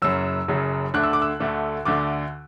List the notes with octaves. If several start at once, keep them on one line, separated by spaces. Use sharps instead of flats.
F#1 F#2 C#3 F#3 E6
F#1 F#2 C#3 F#3
D2 D3 A3 D4 F#6
E6
D6
E6
D2 D3 A3 D4
D2 D3 A3 D4 D6